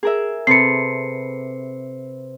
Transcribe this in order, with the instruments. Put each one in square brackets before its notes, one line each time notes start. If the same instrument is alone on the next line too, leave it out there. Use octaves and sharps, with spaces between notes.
[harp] G#4 A#4 E5
[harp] C3 A4 B4 [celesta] C7 C#7